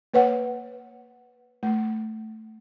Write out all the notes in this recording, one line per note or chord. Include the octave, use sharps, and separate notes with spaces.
A#3 B4 C#5 F#5
A3